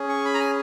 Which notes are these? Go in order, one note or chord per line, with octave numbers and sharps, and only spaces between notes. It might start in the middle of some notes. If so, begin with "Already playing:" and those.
Already playing: C#4 G#4
C#6
B5
A#5
G#5